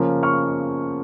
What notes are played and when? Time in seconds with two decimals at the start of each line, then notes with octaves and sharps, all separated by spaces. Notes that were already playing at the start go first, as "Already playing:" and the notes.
Already playing: C#3 F3 A#3 C#4
0.23 C#6 F6